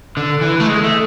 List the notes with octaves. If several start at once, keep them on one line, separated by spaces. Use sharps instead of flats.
D3
E3
A3
G#3
A3